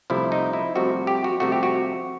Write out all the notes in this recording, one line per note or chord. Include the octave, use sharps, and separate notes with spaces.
C2 C3 F3 A3 E4
D#4
E4
C2 C3 F3 A3 F#4
G4
F#4
C2 C3 F3 A3 F#4
G4
F#4